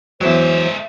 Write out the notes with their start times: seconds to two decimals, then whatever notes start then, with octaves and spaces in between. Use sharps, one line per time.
0.21 E2 F#3 G#3 C5 E5